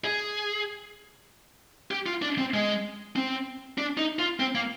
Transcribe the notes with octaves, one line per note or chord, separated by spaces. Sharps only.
G#4
G4
F4
D4
C4
G#3
C4
D4
D#4
F4
C4
A#3